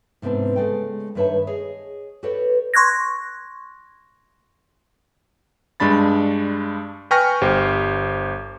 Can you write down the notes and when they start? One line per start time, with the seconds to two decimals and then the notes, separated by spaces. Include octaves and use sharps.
0.22 G#2 C3 B3 C4 D4
0.56 C#3 G#3 A3 G5
1.15 G2 D#3 B4 C#5 E5 A5
1.47 G#4 C#5 D#5
2.23 F#4 G4 A4 B4 C#5 D5
2.74 C6 C#6 F#6 G#6 A#6
5.80 G2 G#3 D4 B5 A6
7.11 B4 G5 G#5 C#6 F6 A#6
7.41 G1 G4 C5